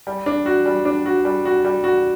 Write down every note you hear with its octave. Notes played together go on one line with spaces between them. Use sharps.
G3
D4
F#4
G3
D4
F#4
G3
F#4
G3
F#4